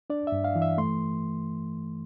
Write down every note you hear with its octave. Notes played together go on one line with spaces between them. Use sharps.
D4 D5
E5
G2
F5
E3
E5
A3 C6